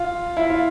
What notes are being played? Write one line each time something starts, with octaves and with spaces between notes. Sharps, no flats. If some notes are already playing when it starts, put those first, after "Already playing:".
Already playing: F4
E4
F4